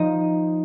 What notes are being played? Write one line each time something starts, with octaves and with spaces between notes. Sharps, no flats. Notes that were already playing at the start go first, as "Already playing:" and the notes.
Already playing: F3 D#4 D#5